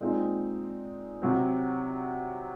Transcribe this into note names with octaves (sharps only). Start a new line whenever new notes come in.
A#2 G#3 C4 D#4
C3 F#3 C4